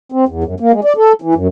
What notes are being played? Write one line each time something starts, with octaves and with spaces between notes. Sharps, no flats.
C4
E2
F#2
A#3
G#3
D5
A4
E3
F#2